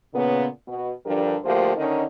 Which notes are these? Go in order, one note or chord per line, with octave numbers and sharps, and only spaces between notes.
A#2 C#3 B3
B2
G2 D3 F3 D4 G4 A#4
D2 F3 A3 A#3 G4 C5
D3 D#3 C#4 D#4